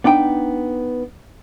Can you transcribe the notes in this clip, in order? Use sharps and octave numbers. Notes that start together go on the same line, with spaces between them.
B3 D4 D#4 G5